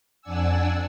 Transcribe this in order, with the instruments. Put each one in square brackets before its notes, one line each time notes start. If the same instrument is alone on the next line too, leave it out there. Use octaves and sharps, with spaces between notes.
[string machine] F2 D4 D5 F#5 G#5 E6